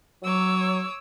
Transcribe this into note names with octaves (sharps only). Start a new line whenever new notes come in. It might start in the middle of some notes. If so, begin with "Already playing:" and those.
F#3 C#5 D6 E6